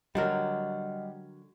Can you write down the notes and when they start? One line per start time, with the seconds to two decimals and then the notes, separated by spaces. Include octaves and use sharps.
0.15 D3 F#3 G3 A#4 D#5 F#5 F6